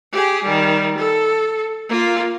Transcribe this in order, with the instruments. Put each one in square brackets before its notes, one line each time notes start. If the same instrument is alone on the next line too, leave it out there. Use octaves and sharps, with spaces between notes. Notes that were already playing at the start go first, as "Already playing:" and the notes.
[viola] G4 G#4
D#3 G3
A4
A#3 F4